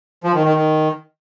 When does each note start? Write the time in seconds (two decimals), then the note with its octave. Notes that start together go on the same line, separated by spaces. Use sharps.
0.24 F3
0.34 D#3
0.44 D#3
0.55 D#3